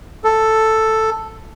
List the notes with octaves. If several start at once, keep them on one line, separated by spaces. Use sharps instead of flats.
A4